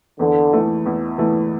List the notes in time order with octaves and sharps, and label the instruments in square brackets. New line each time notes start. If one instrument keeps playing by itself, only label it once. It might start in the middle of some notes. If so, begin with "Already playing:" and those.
[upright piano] E2 [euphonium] D3
[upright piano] E3 A3
E2
E3 A3